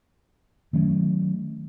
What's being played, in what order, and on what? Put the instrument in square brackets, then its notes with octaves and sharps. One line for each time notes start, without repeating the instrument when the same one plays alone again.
[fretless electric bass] D#3 F#3 A3 C#4